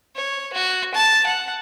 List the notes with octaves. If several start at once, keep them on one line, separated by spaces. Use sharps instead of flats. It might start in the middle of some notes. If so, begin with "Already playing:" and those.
C#5
F#4
A5
F#5